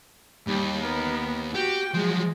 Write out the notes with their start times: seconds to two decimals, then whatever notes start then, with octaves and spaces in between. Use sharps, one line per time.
0.47 D#2 G3
0.80 B3 A#4
1.55 F#4 G4 G5
1.94 F3 F#3 G#3